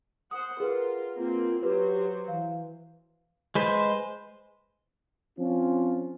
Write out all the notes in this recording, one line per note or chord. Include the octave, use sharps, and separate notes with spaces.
C5 F#5 D#6
F4 G#4 A#4 B4 F#5
A#3 C4 F4
F#3 G4 B4 C5
E3 F5
G#3 B4 C5
F3 C4 C#4 F4